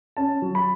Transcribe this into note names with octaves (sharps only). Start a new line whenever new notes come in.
C#4 A5
F#3
B5